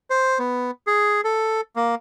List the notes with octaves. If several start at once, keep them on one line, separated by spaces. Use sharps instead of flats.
C5
B3
G#4
A4
A#3